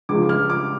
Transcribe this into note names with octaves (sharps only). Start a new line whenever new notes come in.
C#2 C#3 F3 D6
F6
D6